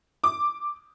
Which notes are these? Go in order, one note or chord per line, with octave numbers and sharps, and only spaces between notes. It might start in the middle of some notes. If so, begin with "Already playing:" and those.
D6